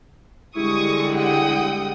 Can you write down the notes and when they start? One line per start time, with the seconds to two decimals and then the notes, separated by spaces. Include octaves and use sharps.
0.56 D3 G3 G#3 E4 C#6 D#6
1.14 F#5 G5 D#6